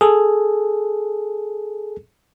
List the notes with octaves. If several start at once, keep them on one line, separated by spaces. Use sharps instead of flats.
G#4 A4